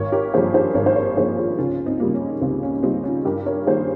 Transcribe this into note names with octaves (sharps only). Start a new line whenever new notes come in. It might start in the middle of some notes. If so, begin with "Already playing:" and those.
Already playing: G#1 A#4 C#5
G4 A#4
G2 F3 A#3 G#4 C5
G#4 C5
G#1 A#4 C#5
C5
A#4 C#5
G2 F3 A#3 G#4 C5
F4 G#4
C#2 C#4 F4
C4 D#4
C#3 G3 A#3
C#4
C#2 C4
C#4
C#4
C#3 G3 A#3 C4 D#4
C#4 F4
G2 G4 A#4
A#4 C#5
D#3 G3 A#3 G#4 C5